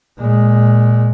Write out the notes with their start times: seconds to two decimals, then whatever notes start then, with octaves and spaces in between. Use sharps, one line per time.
0.19 A#2 G#3